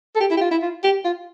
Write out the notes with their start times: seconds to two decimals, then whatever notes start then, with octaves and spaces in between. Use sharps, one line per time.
0.16 A4
0.20 G4
0.31 E4
0.37 G4
0.41 F4
0.51 E4
0.62 F4
0.84 G4
1.05 F4